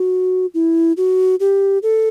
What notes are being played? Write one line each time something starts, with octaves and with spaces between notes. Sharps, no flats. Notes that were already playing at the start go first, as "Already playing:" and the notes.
Already playing: F#4
E4
F#4
G4
A4